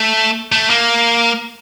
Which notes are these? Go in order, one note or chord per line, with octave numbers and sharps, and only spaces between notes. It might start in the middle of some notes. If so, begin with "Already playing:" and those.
Already playing: A3
A3
A#3